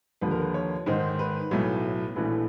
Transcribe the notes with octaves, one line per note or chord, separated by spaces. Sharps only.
D#2 D3 F3 B4
A#4
B4
C#5
G#2 D#3 G#3 C5
B4
B1 A2 F#3 A3
A#1 A2 E3 A3 B4